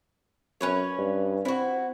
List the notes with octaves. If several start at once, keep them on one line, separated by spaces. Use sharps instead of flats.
F#2 C#4 B4 C#5
G2
C4 E4 F#4